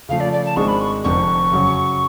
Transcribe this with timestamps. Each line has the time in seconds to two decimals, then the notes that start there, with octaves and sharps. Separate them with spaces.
0.09 C#3 F3 A3 F5
0.20 D5
0.33 D5
0.45 A5
0.56 G#1 G#2 G#3 D4 G#4 C#6
0.68 B5
0.81 C#6
1.04 F1 F2 D3 C#6
1.52 F#2 C#3 F#3